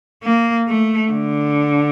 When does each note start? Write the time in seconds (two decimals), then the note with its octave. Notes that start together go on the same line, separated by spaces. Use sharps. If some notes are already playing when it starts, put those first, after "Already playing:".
0.23 A#3
0.68 A3
1.12 D3